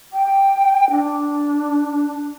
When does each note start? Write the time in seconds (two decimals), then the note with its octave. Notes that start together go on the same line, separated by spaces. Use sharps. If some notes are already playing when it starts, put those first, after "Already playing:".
0.13 G5
0.90 D4